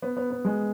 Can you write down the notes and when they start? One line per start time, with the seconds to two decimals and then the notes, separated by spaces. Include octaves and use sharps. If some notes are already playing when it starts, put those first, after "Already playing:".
0.02 B3
0.17 B3
0.30 B3
0.45 G#3